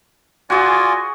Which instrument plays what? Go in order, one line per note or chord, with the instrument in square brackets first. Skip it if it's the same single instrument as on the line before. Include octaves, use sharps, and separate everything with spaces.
[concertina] F4 D5 G#5 [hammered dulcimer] F#4 G#4